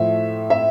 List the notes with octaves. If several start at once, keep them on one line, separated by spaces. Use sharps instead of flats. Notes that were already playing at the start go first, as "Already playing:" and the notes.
Already playing: A2 F3 A3 E5
E5